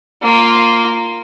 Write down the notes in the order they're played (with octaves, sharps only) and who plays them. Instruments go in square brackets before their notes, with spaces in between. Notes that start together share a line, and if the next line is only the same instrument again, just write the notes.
[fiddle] A#3 F4